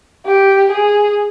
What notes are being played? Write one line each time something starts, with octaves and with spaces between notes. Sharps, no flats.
G4
G#4